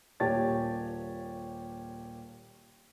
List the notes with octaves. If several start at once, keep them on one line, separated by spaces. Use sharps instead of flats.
D#1 A#2 G4 C#5 A5 A6